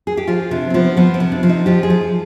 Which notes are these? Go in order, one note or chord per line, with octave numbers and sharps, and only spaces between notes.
G#4
G4
F3 F4
C3 D4
C4
F3 B3
F3 B3
C4
C3
D4
F3
D#4
F3 G4
G#4
F3